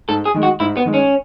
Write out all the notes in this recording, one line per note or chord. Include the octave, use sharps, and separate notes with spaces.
G#2 A4
G#4
D#3 G#3
F#4
G#2 E4
B3
D#3 G#3
C#4